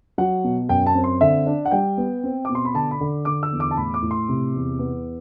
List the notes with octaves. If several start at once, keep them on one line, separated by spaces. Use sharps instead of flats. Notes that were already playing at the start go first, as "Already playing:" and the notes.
F#3 F#5
B2
F#2 G5
A5
C4
C6
D3 E5
D4
F#5
G3 G5
B3
C4
B2 D6
C6
B5
D3 A5
B5
D3
D3 D6
E6
E2
D6
A5
A2 B5
D6
A2
C6
C3
E2
B3